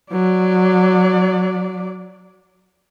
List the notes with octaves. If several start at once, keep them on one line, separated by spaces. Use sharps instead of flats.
F#3 D5